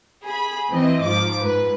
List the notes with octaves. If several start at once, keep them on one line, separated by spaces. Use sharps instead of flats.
G#4 B5
E3 C4 D#5
G#2 F3 D6
G#2 B4